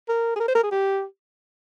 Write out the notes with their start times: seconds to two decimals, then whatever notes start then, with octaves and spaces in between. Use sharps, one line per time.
0.09 A#4
0.36 G#4
0.40 A#4
0.48 C5
0.55 A#4
0.63 G#4
0.71 G4